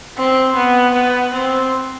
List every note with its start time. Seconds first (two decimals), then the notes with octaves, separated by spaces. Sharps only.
0.17 C4
0.55 B3
0.94 B3
1.32 C4